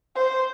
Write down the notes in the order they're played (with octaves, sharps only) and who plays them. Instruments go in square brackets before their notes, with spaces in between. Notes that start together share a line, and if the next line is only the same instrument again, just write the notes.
[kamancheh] C5